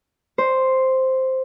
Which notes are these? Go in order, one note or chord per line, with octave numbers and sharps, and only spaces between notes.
C5